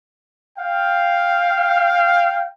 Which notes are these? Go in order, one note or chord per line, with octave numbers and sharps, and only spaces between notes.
F5 G5